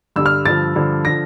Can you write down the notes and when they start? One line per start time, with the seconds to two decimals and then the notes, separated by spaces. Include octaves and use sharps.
0.16 G2 D3 G3 E6
0.26 F6
0.46 G2 D3 F3 A6
0.75 G2 D3 F3
1.05 D3 F3 A#6